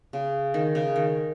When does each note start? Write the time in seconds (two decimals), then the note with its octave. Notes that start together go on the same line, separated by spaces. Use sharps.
0.13 C#3
0.54 D#3
0.75 C#3
0.96 D#3